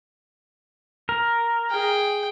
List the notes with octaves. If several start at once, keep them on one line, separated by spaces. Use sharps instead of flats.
A#4
G#4 G5